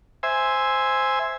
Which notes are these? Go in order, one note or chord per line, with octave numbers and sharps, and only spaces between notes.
C5 E5 G#5